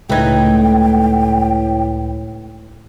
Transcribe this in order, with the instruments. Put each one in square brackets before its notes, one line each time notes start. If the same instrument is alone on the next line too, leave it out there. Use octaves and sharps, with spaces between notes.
[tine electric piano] C#2 B4 G#6 [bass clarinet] A2 [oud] A3 D#4 [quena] G5